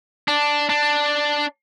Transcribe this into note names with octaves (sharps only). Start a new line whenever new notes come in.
D4
D4